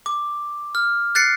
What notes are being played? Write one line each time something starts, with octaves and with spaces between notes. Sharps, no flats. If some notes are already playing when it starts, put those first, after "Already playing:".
D6
F6
F#6 A6 C7 C#7